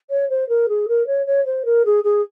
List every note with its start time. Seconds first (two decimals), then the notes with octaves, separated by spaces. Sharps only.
0.10 C#5
0.30 C5
0.49 A#4
0.69 G#4
0.88 A#4
1.07 C#5
1.26 C#5
1.46 C5
1.65 A#4
1.85 G#4
2.04 G#4